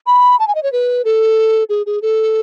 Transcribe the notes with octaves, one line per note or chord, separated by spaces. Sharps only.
B5
A5
G#5
D#5
C#5
B4
A4
G#4
G#4
A4